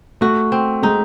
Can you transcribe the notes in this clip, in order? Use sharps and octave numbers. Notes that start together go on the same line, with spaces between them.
A3 F#4
C4
G#3 D#4